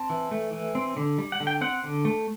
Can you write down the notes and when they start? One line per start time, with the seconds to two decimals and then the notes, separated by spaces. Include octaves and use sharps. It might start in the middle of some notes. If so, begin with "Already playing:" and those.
Already playing: C4 A5
0.10 E3
0.31 A3
0.53 E3
0.75 C4
0.97 D3
1.18 G3
1.32 F#5
1.40 D3
1.47 G5
1.61 C4 F#5
1.84 D3
2.05 A3